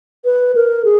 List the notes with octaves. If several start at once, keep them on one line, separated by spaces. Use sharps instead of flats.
B4
A#4
G#4